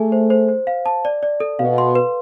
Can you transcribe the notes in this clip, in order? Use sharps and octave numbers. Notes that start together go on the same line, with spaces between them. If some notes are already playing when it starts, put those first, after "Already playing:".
Already playing: A3 G#4 G#5
C5
C5
C5
F5
A5
D5
D5
A4
B2 F5
C6
B4